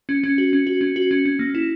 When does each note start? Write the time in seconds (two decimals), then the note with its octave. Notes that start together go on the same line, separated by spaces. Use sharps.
0.09 C#4
0.24 C#4
0.38 F#4
0.53 C#4
0.67 F#4
0.81 C#4
0.96 F#4
1.11 C#4
1.25 C#4
1.39 A#3
1.55 E4